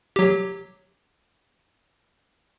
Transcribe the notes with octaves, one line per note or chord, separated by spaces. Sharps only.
F#3 G4